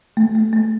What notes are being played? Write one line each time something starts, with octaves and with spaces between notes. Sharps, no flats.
A3
A3
A3